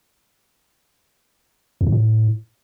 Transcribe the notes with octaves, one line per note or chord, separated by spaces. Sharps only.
E2
G#2
A2